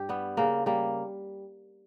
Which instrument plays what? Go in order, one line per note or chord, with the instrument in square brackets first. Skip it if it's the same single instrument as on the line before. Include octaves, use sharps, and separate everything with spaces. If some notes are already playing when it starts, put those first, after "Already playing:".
Already playing: [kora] G2 G4
G3 B3
C#3 A#3
G3 A#3